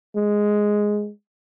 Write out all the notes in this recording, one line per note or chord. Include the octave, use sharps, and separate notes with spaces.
G#3